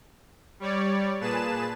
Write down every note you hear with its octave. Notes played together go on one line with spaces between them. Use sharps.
G3 C#5 D5
A#2 G#4 B4 A5 E7